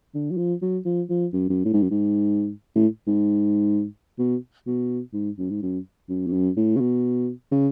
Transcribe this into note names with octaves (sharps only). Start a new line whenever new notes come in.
D3
F#3
F3
F#3
F3
F3
F#2
F#2
A2
G#2
F#2
G#2
A2
G#2
B2
B2
G#2
F#2
G#2
F#2
F#2
F2
F#2
A2
C#3
B2
C#3